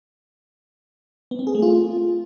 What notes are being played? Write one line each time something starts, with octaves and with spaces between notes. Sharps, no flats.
B3
C4
G#4
A3
F4